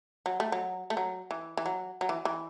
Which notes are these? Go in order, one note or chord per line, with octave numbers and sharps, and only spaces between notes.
F#3
A3
F#3
A3
F#3
E3
E3
F#3
F#3
E3
E3